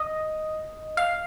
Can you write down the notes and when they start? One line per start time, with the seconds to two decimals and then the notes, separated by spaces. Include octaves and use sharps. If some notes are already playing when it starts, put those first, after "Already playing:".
Already playing: D#5
0.97 F5